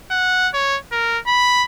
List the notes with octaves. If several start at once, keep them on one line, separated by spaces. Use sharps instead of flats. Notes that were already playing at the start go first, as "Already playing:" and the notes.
F#5
C#5
A#4
B5